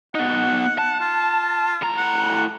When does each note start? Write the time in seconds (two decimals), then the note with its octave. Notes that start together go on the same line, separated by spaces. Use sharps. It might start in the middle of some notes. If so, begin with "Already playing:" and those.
0.15 B3 D#4 F#5
0.78 A5
1.00 F4
1.82 A2 A#5
1.97 F#5